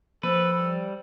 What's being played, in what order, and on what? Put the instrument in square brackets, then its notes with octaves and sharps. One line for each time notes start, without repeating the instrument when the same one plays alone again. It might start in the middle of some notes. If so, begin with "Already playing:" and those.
[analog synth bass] F3 [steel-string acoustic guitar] C4 [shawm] A4 [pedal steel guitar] B4
[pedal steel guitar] G3